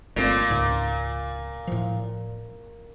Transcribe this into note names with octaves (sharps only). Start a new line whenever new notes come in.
G1 A#2 A3 C4
C#2 G#2
A2 F3